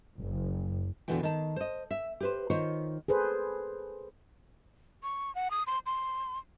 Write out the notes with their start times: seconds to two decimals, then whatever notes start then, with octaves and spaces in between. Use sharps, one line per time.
0.21 F#1
1.08 E2 A#2 D3 E3 F#4 G5
1.23 D#3 A5
1.56 C5 D#5
1.91 E5
2.20 G4 B4 C5
2.50 D#3 F4 C5 C#5
3.08 G#4 A4 B4 C5
5.03 C#6
5.35 F#5
5.51 D#6
5.67 C6
5.86 C6